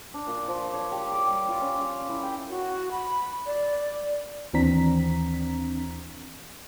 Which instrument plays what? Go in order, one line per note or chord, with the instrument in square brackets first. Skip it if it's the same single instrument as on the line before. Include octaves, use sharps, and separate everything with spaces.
[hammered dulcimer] D4
A#2
F3
C#5
G4
D6
G3
F4
C#4
F5
E4
G5
[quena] F#4
B5
D5
[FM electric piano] D#2 E3 C4 D4 A#5 B6